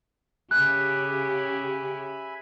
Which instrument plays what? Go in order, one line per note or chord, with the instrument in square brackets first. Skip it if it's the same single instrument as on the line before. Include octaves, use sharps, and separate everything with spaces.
[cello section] C#3 G4 [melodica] E5 G#5 B5 [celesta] F#6